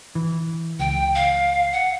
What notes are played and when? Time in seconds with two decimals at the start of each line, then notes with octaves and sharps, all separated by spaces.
0.15 E3
0.79 C#2 G5
1.15 F5
1.73 F#5